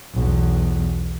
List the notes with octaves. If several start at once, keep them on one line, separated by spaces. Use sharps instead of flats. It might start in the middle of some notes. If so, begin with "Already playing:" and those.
B1 E2